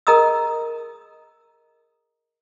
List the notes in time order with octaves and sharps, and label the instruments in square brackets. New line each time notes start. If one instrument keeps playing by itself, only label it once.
[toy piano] G#4 A#4 D#5 A#5 D#6 E6